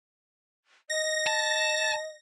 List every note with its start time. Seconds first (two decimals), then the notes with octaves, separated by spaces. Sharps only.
0.90 D#5 A#6
1.26 A5